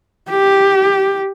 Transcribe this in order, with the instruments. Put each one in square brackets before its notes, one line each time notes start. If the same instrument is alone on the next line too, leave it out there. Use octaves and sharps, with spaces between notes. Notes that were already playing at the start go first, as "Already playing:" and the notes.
[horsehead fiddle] G4